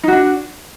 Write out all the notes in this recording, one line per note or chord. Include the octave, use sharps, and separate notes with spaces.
D4 D#4 F#4